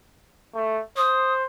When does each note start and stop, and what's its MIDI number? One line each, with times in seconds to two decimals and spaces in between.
0.54 0.81 57
0.97 1.45 72
0.97 1.34 87